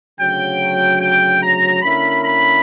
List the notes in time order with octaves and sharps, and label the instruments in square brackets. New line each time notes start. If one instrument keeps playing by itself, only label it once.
[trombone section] D2 C#3 F#3 [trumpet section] G5
[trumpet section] G5
A#5
[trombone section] D3 A#3 C#4 E4 A#4 [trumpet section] B5
[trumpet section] B5